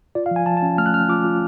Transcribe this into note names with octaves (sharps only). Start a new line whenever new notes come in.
F4 D5
F5
F3
G#5
F3 A5
A5
C#4
A3 F6
F#6
C#4 F6
F4 D6
F4